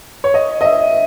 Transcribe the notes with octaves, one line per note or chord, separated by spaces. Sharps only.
C#5
D#5
D#5
E5